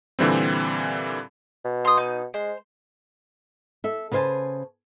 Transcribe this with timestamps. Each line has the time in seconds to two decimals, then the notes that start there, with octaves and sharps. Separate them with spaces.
0.19 A#2 D3 E3 G3 C4
1.65 B2
1.85 C6 D#6
1.97 D#4
2.34 G#3 C5
3.84 A4 E5
4.12 C#3 B4 C5 F5 G#5 A5